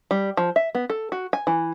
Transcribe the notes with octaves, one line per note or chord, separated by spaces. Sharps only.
G3
F3
E5
B3
A4
F#4
G#5
E3